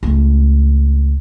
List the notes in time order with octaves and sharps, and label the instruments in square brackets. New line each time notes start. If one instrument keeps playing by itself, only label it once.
[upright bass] C#2 A3